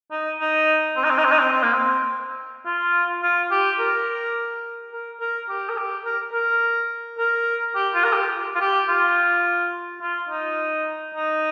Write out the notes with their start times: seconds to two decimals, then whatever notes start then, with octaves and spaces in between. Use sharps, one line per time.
0.11 D#4
0.39 D#4
0.97 C4
1.04 D#4
1.10 C4
1.18 D#4
1.25 C4
1.32 D#4
1.39 C4
1.53 C4
1.63 A#3
1.74 C4
2.66 F4
3.23 F4
3.51 G4
3.79 A#4
4.92 A#4
5.20 A#4
5.49 G4
5.69 A#4
5.78 G4
6.05 A#4
6.33 A#4
7.18 A#4
7.75 G4
7.94 F4
8.04 A#4
8.13 G4
8.56 F4
8.61 G4
8.88 F4
10.02 F4
10.30 D#4
11.15 D#4